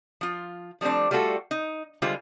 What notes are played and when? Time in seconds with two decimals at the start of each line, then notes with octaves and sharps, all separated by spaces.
0.21 F3 F4
0.81 F3 G3 A3 C4 D4
1.11 G3 A3 F4 F#4 A4
1.51 D#4
2.02 D3 G3 G#3 F4 C5